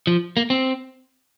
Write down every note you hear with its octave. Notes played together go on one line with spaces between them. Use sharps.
F3
A#3
C4